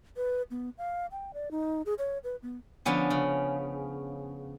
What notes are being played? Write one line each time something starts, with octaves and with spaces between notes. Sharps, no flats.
B4
B3
F5
G5
D5
D#4
G#4
C#5
B4
B3
D3 F3 B3 C#4
C#3